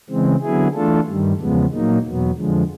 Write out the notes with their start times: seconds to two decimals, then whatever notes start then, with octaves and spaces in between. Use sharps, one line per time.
0.09 C#3 E3 G#3 C4
0.42 D3 F#3 B3 E4 G#4
0.74 E3 A3 D4 F4 A4
1.07 G2 D#3 G3
1.40 E2 C#3 F3 G#3 B3
1.73 A#2 F#3 A#3 D#4
2.05 E2 B2 F#3 B3
2.37 F2 D3 F3 G#3